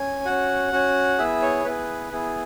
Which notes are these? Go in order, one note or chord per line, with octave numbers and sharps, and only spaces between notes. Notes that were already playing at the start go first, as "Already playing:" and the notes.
Already playing: C#4 G#5
C#4 F#4 F#5
C#4 F#4
B3 E4 G#4 E5
C#5
B3 E4 G#4 B4
B3 E4 G#4